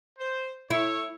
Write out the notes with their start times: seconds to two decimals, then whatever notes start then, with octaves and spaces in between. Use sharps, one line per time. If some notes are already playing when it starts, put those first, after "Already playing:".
0.18 C5
0.70 E4 A4 C#5